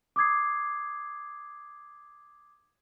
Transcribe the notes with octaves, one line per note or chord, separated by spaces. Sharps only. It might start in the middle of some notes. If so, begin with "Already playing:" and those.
D6 D#6 G#6 C7